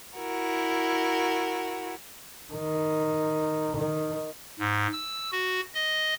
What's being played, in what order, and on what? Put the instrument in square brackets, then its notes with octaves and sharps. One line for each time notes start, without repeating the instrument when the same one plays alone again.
[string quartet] E4 F#4 A#4
[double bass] D#3
D#3
[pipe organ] G#2
E6
F#4
D#5